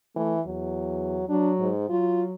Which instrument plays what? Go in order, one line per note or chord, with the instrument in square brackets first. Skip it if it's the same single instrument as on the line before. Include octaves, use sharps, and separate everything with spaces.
[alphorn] E3 [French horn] A3
[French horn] E2 [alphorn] F#3
[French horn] F#3 [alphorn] D4
[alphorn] G#2
[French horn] F#3 [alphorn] F4